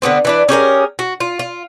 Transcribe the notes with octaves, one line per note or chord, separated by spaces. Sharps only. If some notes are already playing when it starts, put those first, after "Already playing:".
D3 F3 B3 C4
E3 D4 B4
C#4 G4 G#4 A#4
F#4
F4
F4